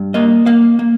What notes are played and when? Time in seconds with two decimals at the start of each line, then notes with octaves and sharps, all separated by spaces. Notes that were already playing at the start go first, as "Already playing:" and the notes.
Already playing: G2
0.14 A#3 D#5
0.46 A#3 F5
0.79 A#3